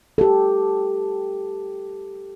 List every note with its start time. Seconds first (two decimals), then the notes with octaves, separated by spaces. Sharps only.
0.18 G4 A4